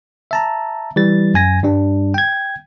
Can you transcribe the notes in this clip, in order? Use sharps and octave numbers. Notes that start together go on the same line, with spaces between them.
E5 A5 A#5
E3 G3 A6
F#2 G#5 A#6
G2 G3 D4
G5 G#6